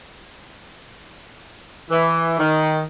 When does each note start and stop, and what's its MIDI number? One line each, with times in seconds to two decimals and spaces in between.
1.91 2.37 52
2.39 2.82 51